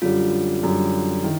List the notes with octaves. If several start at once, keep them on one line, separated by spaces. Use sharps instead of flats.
F#2 D3 G3 F4
F#2 D3 G3
D#3 E4